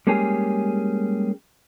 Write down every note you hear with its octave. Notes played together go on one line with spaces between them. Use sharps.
G3 G#3 A#3 C#4 G4 G#4